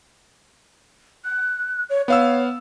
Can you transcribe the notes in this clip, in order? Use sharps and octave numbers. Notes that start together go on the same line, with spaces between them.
F#6
C#5
B3 C#5 F5 E6